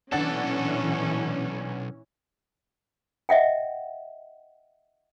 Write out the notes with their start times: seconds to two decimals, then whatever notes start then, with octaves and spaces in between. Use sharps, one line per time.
0.12 B1 A#2 E3 C#4 D4 A4 F#5 A6
3.29 D#5 E5 F#5 G5